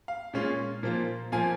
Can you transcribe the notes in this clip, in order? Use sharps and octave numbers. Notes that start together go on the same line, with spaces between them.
F5
A#2 G#3 C#4 F4
A#2 F3 A#3 F4
A#2 F3 A#3 F4 G#5